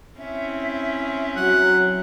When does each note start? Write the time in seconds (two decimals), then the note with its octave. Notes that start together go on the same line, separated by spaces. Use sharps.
0.18 C4 C#4 E4 E5
1.36 F#3 F#5